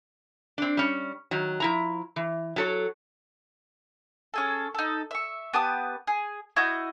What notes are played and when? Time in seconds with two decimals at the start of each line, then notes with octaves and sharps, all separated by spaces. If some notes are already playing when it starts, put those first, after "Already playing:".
0.58 C4 D4
0.77 G3 C#4
1.31 D#3 F#3
1.60 F3 E4 A#5
2.16 E3
2.56 F#3 A4 C#5
4.34 C#4 G#4 A4
4.75 D#4 A4
5.11 E5 C#6
5.53 B3 G4 A5 D#6
6.07 G#4
6.56 E4 F#4 D#5 G6